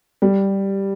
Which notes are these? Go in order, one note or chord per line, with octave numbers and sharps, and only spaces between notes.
G3